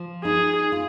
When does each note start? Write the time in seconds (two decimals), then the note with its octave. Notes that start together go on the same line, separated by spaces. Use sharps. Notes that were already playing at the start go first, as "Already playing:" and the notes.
Already playing: F3
0.25 D#4 G#4
0.72 F4